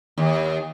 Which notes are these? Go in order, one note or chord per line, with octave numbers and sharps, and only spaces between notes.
D#2